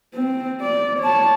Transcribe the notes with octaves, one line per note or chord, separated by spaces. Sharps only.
C4
D5
C#5 A5